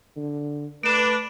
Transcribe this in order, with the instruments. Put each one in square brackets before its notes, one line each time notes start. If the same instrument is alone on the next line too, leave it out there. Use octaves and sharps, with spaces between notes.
[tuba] D3
[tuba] A3 [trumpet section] D4 [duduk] B4 [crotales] D7 E7